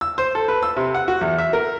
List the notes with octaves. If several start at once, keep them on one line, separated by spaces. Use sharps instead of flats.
E6
C5
A4
B4
E6
C3
F#5
F#4
E2
E5
A#4